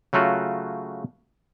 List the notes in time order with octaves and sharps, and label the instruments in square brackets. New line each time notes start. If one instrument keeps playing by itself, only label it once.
[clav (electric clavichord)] C#3 F#3 A3 F4 F#4